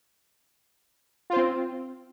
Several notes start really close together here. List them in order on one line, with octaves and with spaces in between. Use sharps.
F4 C5 C4